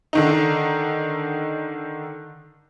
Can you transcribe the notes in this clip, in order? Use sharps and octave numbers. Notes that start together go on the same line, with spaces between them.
D3 D#3 D#4